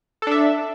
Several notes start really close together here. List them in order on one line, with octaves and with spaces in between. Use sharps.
A4 D4 E5